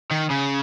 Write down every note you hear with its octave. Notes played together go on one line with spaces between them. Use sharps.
D#3
C#3